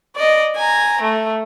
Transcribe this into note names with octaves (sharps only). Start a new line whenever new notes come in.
D5 D#5
G#5 A#5
A3